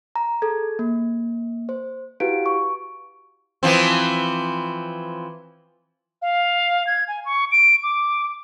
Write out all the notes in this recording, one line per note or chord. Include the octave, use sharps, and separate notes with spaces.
A#5
G#4 A4 G#6
A#3
C5
E4 F#4 G4 B4 F5 D7
C#6
E3 F3 C4
F5
G#6
G#5
C#6
D7
D6